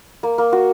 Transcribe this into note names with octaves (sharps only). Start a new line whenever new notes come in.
A#3
A#3
F#4